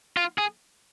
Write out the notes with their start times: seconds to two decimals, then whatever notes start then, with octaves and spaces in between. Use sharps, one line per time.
0.17 F4
0.38 G#4